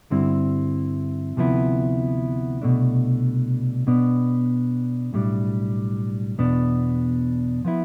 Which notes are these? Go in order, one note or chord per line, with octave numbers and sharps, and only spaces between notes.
G2 D3 G3 C4 E4
D2 C3 F3 B3 E4
C2 B2 A3 D4
B2 B3 D4
B1 A2 G3 D4
E2 B2 B3 D4
F3 B3 E4